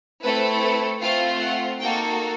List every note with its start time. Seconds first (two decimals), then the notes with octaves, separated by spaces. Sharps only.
0.22 A3 C4 E4 A4 B4
0.62 B4
1.01 A3 C4 F4 F5
1.40 F#5
1.80 A#3 D#4 F#4 A4 G5